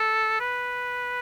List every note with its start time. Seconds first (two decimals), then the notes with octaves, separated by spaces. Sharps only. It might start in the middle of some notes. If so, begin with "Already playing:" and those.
Already playing: A4
0.40 B4